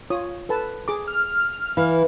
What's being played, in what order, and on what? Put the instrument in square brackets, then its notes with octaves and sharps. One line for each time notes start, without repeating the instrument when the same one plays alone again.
[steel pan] F4 C#5 D#6
A4 B4 A5
G#4 D6
[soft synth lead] F6
[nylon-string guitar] E3 [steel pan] F5